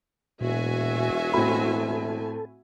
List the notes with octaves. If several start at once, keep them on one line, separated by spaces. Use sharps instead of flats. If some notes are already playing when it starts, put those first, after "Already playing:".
E1 A#2 F#4 E5 G#5
A2 C4 A4 B5